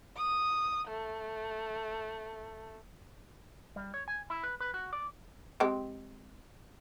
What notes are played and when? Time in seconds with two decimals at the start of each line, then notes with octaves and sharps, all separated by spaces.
0.17 D#6
0.88 A3
3.76 G3
3.94 C#5
4.08 G#5
4.30 E4
4.44 B4
4.60 B4
4.74 F#4
4.93 D5
5.60 G#3 C4 G4